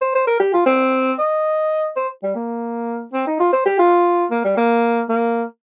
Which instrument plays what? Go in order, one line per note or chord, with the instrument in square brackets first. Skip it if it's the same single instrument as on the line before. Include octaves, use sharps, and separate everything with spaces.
[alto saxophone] C5
C5
A#4
G4
F4
C4
D#5
C5
G3
A#3
C4
D#4
F4
C5
G4
F4
A#3
G3
A#3
A#3